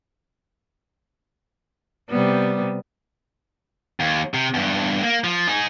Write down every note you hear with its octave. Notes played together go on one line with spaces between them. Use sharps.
C3 G3 B3
D#2
C3
E2 G2
A#3
F3
D#4 G#4